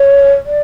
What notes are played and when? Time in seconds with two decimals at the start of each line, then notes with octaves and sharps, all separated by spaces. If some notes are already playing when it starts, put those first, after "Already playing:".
Already playing: C#5
0.46 D5